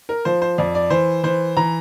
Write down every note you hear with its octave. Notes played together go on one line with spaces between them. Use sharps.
A#4
F3 C5
C5
F2 D5
D5
E3 C5
E3 C5
E3 A#5